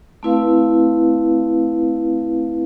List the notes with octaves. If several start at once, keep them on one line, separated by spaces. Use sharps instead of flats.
A3 C4 E4 B4 F5